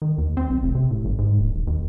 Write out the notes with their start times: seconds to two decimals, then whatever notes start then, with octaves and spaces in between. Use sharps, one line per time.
0.02 D#3
0.18 D#2
0.37 C4
0.50 B1
0.63 F1
0.75 C3
0.91 A2
1.05 G1
1.19 G#2
1.39 D1
1.55 D#1
1.67 D#2